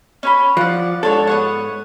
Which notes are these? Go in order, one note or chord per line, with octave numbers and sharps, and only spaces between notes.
C#4 C#5 B5
F3 D5 F#5
G#2 D4 A4 C#5
B3 C#5 F#5